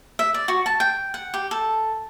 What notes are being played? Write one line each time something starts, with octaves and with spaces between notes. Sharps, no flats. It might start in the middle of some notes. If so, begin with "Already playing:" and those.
E5
D5
F#4
A5
G5
F#5
G4
A4